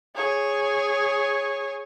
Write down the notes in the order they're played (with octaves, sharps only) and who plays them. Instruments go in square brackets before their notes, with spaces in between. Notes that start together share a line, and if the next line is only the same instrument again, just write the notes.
[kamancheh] G#4 C#5